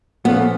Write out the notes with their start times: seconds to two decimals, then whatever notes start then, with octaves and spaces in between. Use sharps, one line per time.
0.24 A#2 F3 A3 B3 C#4 F4